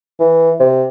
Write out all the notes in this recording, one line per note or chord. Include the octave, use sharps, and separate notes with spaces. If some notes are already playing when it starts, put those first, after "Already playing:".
E3
C3